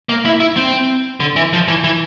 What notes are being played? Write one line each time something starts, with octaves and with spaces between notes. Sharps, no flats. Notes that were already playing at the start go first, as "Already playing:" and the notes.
A#3
E4
E4
C4
D3
E3
F3
E3
E3